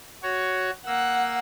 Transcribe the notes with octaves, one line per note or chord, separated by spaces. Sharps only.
F#4 C#5
A#3 F#5 E6